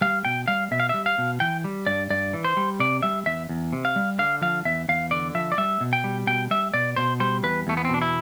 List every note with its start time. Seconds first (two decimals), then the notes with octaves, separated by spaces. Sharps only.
0.01 G3 F5
0.25 B2 G5
0.48 G3 F5
0.71 B2 E5
0.80 F5
0.89 G3 E5
1.06 F5
1.18 B2
1.40 E3 G5
1.64 G3
1.87 G2 D5
2.10 G2 D5
2.33 E3
2.44 C5
2.57 G3
2.80 C3 D5
3.03 G3 E5
3.26 E2 E5
3.49 E2
3.73 C3
3.85 F5
3.96 G3
4.19 D3 F5
4.41 F3 F5
4.65 E2 E5
4.89 E2 F5
5.11 D3 D5
5.35 F3 E5
5.52 D5
5.58 G3 E5
5.81 B2
5.93 G5
6.04 G3
6.27 B2 G5
6.51 G3 E5
6.74 B2 D5
6.96 B2 C5
7.20 G3 C5
7.43 E2 B4
7.67 E2 A3
7.77 B3
7.85 C4
7.89 B2 D4
8.02 E4